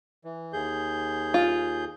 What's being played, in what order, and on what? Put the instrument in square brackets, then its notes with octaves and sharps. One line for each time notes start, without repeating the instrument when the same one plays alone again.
[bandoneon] E3
D#2 G#4 G6
[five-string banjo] F4